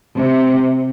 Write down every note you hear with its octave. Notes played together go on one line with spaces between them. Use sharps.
C3